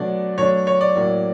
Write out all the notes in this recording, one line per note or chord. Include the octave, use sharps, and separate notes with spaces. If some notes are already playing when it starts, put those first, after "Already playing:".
Already playing: B2 F#3 A3 D4 D5
B2 F#3 A3 D4 C#5
C#5
D5
A2 F#3 A#3